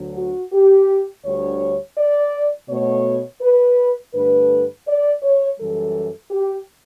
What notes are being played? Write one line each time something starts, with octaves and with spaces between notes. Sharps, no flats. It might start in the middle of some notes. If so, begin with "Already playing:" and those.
Already playing: D2 D3 F#3
F#4
G4
D2 D3 G3 C#5
D5
B2 A3 C#5
B4
G2 D3 A3 B4
D5
C#5
F#2 E3 G3 A4
G4